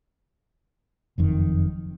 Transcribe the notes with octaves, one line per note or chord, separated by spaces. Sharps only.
F#1 F2 D#3